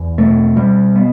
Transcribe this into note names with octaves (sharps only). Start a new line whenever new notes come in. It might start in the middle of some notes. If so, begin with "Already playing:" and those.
Already playing: E2
B2 A3
B2 G3
B3